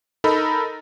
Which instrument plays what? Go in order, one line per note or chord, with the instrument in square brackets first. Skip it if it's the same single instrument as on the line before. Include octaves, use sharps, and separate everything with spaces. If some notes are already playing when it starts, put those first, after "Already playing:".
[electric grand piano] D#4 A4 A#4 D#5 A#5 B5